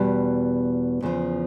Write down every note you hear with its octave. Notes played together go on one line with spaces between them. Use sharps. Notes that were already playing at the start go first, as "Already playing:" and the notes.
Already playing: E2 B2 G3
E2 C#3 F3